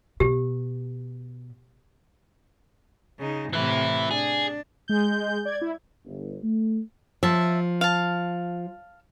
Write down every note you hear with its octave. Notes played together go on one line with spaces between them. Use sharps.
B2 G4
C#3 D#4
A2 C3 E3 E4
D4 G#4
G#3 G6
D5 G#6
E4
G1
A3
F3 E5 A5
F5 A5